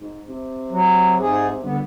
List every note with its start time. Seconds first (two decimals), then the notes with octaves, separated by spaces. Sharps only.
0.01 G#2
0.29 C3
0.70 F#3
1.20 G#2 G#4
1.63 G2 D3 B3